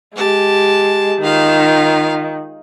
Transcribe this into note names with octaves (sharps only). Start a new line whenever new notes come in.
G#3 G4 A5
D#3 F4 F5